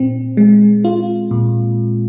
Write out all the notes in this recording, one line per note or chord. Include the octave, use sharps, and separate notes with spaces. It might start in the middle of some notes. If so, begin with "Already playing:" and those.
Already playing: A#2 C4
G#3
F4
A#2